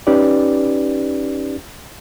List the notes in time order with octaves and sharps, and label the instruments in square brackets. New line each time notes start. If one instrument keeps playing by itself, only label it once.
[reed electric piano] C#4 D#4 G4 B4 D5